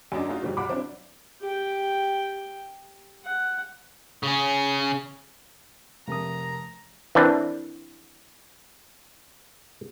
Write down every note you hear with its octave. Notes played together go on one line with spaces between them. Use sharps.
F#2 F#3 D4 D#5
A3 D#4 F4 F#4
G1 B2 F3 G3 D5
B1 F4 F#5 A#5 B5 D6
F#3 C4 D4 E4
G4 G5
F#5
C#3 C#4
F1 C3 A#4 A#5 D#6
E3 C4 D4 A#4 B4